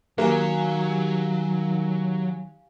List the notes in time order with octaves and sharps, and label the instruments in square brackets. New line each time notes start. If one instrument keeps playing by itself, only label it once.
[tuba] D#3 [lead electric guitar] F#3 [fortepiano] A#3 [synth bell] G4 F5 G#5